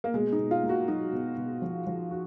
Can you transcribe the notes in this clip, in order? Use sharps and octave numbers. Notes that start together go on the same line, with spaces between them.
A#3
B2 G#3
D#4
B2
F4
A#3
F#4
F#3 D#4
B2
B2
F3
F3
F#4